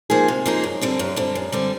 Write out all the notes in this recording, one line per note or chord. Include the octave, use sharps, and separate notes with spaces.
F3 A#3 D#4 G#4
C3
F3 A#3 D#4 G#4
F#2
D3 G3 C4
F#2
D3 G3 C4
F#2
D3 G3 C4